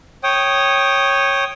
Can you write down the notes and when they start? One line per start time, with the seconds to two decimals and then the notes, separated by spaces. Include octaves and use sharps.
0.23 C#5 G5 D#6